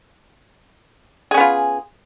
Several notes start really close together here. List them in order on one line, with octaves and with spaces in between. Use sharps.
G#4 C#4 B3 F4